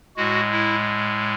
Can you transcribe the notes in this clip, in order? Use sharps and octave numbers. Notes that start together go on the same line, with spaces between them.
A2 G#3 F#4
E4